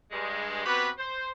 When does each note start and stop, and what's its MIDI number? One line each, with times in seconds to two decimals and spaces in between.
0.11 0.63 43
0.11 0.63 56
0.65 0.89 59
0.65 0.89 60
0.65 0.89 66
0.65 0.89 67
0.65 0.89 71
0.99 1.29 72